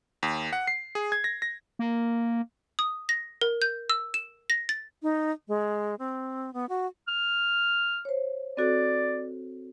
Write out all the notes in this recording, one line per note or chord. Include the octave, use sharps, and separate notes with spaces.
D#2
F#5
C7
G#4
G#6
A#6
A#6
A#3
D#6
A#6
A#4
G6
E6
E7
A#6
A6
D#4
G#3
C4
B3
F#4
F6
C5 C#5
C4 F#4 A4 D5